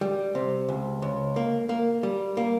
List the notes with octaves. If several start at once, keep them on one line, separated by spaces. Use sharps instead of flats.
G3
C3
C#2
C#2
A#3
A#3
G3
A#3